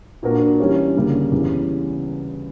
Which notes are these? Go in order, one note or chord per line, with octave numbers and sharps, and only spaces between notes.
A#2 A#3 D4 F#4 A#4
E3 G3 C#4 G4 C#5
D2 C#3 G3 A#3 C#4
E2 C#3 G3